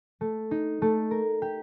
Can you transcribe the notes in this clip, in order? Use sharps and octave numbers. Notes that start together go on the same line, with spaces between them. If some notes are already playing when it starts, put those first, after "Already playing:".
A3
D#4
A3
A#4
G4